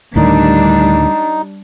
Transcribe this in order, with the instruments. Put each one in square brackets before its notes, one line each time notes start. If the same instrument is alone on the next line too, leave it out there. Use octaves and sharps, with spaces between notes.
[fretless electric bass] D2 A2 D#3 [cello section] G3 D4 [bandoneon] D#4